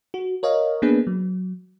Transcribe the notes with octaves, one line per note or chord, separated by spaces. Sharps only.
F#4
A#4 C#5 D#5 F5
A#3 B3 D4 G#4 B4
F#3